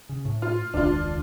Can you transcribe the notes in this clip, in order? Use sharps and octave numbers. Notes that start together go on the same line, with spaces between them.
C#3
A2
F4
E1 C#2 D#3 D4 F4